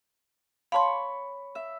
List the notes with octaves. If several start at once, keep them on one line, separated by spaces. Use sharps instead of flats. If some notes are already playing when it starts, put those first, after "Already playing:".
C#5 F5 A5 B5 C6
E5